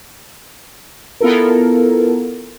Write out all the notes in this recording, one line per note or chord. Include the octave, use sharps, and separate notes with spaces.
B3 E4 F4 A4 A#4